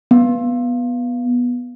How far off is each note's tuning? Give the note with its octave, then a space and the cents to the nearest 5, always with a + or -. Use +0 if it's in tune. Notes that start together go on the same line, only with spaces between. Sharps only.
B3 -10